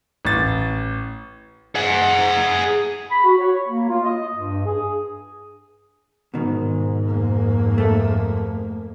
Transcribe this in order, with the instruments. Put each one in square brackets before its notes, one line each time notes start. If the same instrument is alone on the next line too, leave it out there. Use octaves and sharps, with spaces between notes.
[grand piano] A1 A6
[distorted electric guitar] G#4 F#5
[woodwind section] B5
F#4
C#5
A#3
F4
D#5
G2
G#4
[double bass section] G#2 [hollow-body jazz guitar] B2 D#3
[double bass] F2 A#3
[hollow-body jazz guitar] A3 A4